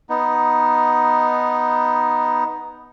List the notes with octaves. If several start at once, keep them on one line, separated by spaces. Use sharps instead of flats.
B3 D#4